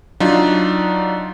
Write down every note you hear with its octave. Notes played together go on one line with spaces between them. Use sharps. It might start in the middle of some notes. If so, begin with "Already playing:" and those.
F#3 D4 D#4 F4